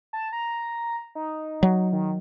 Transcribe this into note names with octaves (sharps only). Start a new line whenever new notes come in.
A5
A#5
D#4
F#3
D#3